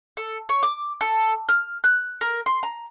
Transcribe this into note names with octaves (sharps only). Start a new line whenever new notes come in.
A4
C#5
D6
A4
F6
F#6
A#4
C6
A#5